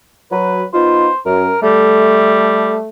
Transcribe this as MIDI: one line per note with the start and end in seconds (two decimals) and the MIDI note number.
0.32 0.65 54
0.32 0.64 71
0.74 1.08 59
0.74 1.08 63
0.74 1.08 65
0.74 1.18 72
1.26 1.52 42
1.26 1.62 70
1.62 2.78 55
1.62 2.86 57